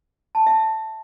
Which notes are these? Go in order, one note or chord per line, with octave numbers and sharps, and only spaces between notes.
A5
E5